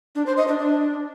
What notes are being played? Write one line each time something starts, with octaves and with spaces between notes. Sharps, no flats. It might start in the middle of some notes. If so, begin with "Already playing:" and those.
D4
C5
D#5
D4
D4